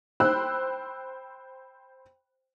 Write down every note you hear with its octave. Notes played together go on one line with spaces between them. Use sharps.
C5 G5 B5 E6 F#6